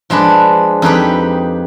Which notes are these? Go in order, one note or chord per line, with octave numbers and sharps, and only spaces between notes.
F3 G#3 D4 B4
F2 D#4 G4 B4